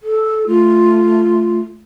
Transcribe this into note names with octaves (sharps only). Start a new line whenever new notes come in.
A4
A3 F4